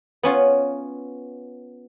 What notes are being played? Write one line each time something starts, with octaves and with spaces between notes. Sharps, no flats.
B3 C#4 F4